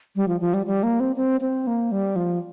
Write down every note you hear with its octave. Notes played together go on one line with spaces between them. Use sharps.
G3
F3
F3
G3
G3
A#3
C4
C4
C4
A#3
G3
F3